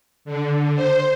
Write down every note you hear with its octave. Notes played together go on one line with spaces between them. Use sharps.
D3
C5